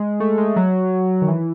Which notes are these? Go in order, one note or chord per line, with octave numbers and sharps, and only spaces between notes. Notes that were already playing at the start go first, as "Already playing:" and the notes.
Already playing: G#3
A3
G#3
F#3
D#3
E3